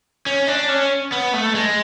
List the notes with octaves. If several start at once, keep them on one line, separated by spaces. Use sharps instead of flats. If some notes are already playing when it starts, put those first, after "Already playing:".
C#4
D4
C#4
B3
A3
G#3